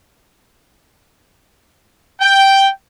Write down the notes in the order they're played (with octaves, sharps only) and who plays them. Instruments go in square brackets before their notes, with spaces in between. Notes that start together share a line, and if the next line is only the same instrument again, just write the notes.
[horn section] G5